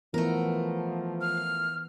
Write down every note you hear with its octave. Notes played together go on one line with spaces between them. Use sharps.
E3 F3 A3 B3 A#4
F6